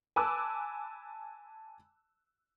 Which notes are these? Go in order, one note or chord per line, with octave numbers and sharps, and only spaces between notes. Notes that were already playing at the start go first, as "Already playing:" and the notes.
G#5 A5 B5 D6 E6 F#6